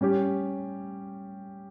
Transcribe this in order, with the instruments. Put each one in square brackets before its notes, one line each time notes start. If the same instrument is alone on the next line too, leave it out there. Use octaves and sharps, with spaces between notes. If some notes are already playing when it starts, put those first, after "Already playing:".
[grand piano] G3 C#4 G4